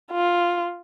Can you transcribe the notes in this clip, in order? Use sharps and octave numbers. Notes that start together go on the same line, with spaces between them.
F4